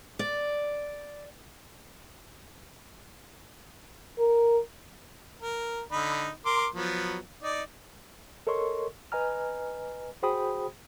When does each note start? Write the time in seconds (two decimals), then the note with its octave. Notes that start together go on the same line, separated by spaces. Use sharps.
0.19 D5
4.19 A#4
5.42 A#4
5.92 D3 D#4 B5
6.46 A#4 C6 D6
6.75 F3 F#3 B3
7.43 D#4 D5
8.47 A4 A#4 C#5 D#5 C6 C#6
9.12 B4 D#5 G#5 A#5 F6
10.23 F#4 G#4 C5 G5 B5 D#6